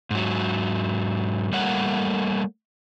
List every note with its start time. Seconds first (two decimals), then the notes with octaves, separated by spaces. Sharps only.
0.11 G#2 F#3
1.52 G3 A3 A#3 C#5 F#5